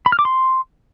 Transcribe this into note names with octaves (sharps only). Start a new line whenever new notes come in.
B5
F6
D6
C6